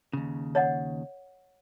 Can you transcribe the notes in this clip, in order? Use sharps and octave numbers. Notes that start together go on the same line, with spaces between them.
D#2 C#3
C#5 D#5 F#5